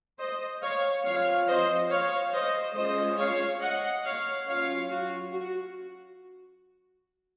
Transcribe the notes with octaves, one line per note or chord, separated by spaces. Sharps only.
C5 D#5
C#5 F5
F3 C4 F4 C#5 F5
C5 D#5
C#5 F5
C5 D#5
G#3 C#4 F4 C5 D#5
C#5 F5
D#5 F#5
C#5 F5
F#3 C#4 F4 C#5 F5
F#4
F#4